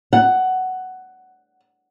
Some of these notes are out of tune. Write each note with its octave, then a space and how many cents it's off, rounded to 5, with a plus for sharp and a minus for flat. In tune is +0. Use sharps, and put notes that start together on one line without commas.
F#5 +10